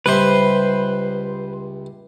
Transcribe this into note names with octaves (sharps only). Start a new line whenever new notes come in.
C#2 G3 B4 C5 E5